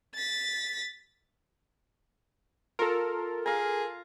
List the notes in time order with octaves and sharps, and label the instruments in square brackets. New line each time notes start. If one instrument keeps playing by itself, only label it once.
[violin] A6 B6
[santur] F4 [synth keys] A4 A#4
[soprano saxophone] G#4 [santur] F5 A#5